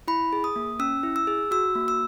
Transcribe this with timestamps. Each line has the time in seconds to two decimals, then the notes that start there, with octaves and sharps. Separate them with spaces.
0.08 E4 B5
0.33 G#4
0.44 D#6
0.56 A#3
0.79 C#4 E6
1.03 E4
1.16 E6
1.27 G#4
1.51 F#4 E6
1.75 A#3
1.88 E6